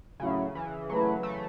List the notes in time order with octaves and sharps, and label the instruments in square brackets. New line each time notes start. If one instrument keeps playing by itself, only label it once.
[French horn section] A2 F#3 C#4 E4 [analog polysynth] C#3
[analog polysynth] E3
[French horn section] E3 A3 E4 B4 [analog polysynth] F#3
[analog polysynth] A3